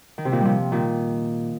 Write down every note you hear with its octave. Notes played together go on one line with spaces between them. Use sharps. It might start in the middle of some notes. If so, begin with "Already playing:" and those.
D#3
C3
A#2 D#3
C3 F3 G3
A#2 D#3